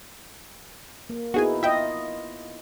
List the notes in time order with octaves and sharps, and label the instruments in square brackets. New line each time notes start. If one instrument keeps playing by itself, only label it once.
[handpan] A#3
[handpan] B3 D#4 E4 [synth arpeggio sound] F#4 G#4 G#5
[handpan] F4 D#5 [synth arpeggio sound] E5 G5